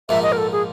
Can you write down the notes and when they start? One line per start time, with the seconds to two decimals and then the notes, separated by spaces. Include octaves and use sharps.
0.09 A#1 G#2 F3 A#3 E5
0.23 D#5
0.32 A#4
0.38 A4
0.52 G#4